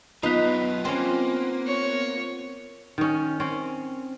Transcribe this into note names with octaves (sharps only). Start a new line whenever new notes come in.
F#2 B3 D#4 F4 B4
A#3 C4 C#4
C#5
D#3 C#4
C4 C#4